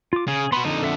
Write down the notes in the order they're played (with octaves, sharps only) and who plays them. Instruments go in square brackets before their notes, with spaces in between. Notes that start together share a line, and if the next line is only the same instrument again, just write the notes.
[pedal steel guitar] F4 D6
[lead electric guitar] C#3 [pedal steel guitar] G#4
[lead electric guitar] B3 F#4 [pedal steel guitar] B5 C6
[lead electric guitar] F2 D3 [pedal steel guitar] D#4
[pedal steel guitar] A4 E5 F#5